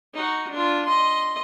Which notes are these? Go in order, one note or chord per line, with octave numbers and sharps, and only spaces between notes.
D#4 F#4
D4 F4
D#5 C6